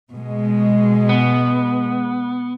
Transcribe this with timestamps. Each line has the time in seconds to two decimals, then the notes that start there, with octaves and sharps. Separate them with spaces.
0.11 B2 G#3
1.09 B3